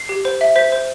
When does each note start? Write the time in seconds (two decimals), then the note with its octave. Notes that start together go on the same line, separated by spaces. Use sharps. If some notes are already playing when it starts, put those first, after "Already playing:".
Already playing: C7
0.09 G4
0.25 C5
0.41 E5
0.56 C5 B6
0.72 C5